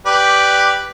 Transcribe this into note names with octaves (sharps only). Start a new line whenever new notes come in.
G4 B4 D5